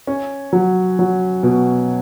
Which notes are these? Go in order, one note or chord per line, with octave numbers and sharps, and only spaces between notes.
C#4
F#3
F#3
B2